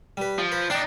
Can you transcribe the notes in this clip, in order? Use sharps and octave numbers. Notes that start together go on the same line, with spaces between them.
G3 B4
F3
B4
D4 D#4 D5 G5